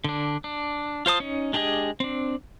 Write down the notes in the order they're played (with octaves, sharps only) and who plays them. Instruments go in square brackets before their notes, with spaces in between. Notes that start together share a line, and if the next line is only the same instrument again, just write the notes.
[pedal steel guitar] D3 D4
D4
F4 C5 A5 D#6
C#4 D#4
G#3 D4 G4 G#4 D#5
C4 D4